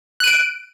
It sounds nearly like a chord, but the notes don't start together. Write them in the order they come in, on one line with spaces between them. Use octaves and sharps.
F#6 D#7 D7